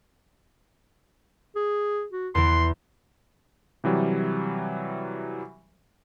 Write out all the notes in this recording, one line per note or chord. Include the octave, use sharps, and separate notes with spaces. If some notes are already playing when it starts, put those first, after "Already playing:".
G#4
F#4
E2 E3 C6
C3 E3 F#3 G3